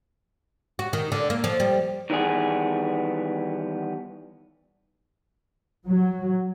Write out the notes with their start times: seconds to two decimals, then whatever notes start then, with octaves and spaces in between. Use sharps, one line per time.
0.79 F#4
0.93 D#3
1.12 D3
1.30 A#3
1.44 F3
1.60 G3
2.10 D#3 E3 G3 B3 G#4
5.87 F#3